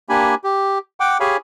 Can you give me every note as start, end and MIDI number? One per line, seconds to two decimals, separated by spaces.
0.09 0.35 58
0.09 0.35 62
0.09 0.35 67
0.09 0.35 80
0.09 0.35 83
0.44 0.78 67
1.00 1.18 78
1.00 1.18 79
1.00 1.18 86
1.20 1.37 67
1.20 1.37 68
1.20 1.37 73
1.20 1.37 77
1.20 1.37 80
1.20 1.37 83